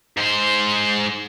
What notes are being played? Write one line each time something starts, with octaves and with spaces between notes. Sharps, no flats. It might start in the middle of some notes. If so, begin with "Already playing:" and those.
G#2 C5